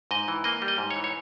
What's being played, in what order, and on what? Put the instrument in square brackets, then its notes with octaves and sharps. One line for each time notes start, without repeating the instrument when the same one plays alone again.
[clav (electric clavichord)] G#2 D#5
E3
A#3 D#5
G3
D#5
G#2
C#5
E3
C#5